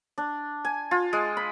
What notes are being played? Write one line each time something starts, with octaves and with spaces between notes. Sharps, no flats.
D4
G#5
F4
G#3
B5